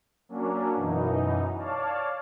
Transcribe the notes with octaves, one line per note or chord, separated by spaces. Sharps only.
F#3 A#3 C#4 D4
F#2 B2 E3 D#4
C#5 D5 F5 A5